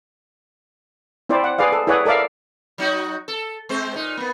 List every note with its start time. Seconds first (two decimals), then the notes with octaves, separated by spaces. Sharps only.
1.29 C4 E4 C5 D5
1.44 F#5
1.58 G#4 B4 D5 F5
1.72 A4
1.87 E4 G#4 B4 C#5 D5 F#5
2.06 A4 A#4 D5 E5 F5
2.78 F#3 D#4 F#4
3.28 A4
3.69 G#3 C4 C5
3.94 A#2 D#4
4.17 A#3 B3